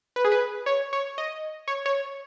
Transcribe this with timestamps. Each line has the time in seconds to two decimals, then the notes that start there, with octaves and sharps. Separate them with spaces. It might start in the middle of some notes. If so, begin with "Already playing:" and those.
0.16 B4
0.25 G#4
0.32 B4
0.66 C#5
0.93 C#5
1.18 D#5
1.68 C#5
1.86 C#5